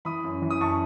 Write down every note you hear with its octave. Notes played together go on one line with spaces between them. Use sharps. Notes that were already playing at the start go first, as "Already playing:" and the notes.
E3 B5 D#6
F#2
E3
D#6
F#2 A5 C#6